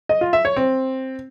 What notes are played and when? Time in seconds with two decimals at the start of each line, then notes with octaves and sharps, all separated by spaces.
0.09 D#5
0.21 F4
0.33 E5
0.45 C#5
0.57 C4